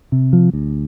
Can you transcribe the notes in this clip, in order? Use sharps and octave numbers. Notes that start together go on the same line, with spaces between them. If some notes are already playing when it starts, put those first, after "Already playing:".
C3
F3
D2